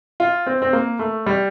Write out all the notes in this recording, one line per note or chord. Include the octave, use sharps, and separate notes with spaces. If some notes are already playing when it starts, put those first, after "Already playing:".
F4
C4
C4
A#3
A3
G3